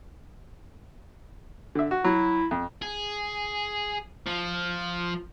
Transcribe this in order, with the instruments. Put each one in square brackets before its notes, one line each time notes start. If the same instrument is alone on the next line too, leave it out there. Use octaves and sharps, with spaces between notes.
[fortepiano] D3 E5
F#4
[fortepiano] F#3 [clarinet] E4
[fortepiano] F2
[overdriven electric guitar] G#4
F3